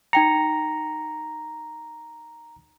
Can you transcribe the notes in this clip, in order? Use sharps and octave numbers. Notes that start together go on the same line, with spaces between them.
D#4 G5 A#5 C#7